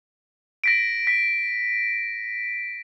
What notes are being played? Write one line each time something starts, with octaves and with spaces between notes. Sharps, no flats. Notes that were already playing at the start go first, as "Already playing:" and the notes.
A#6 B6 D7
B6